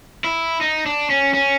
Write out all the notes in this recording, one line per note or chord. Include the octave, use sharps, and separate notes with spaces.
E4
D#4
D4
C#4
C#4